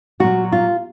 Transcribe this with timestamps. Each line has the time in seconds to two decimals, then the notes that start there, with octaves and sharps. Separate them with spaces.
0.20 A#2 F#3 A#3 F#4
0.52 F4